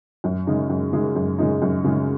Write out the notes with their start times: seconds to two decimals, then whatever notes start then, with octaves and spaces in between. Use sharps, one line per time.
0.24 F#2
0.47 C#3 G#3 D#4
0.69 F#2
0.93 C#3 G#3 D#4
1.16 F#2
1.39 C#3 G#3 D#4
1.62 F#2
1.84 C#3 G#3 D#4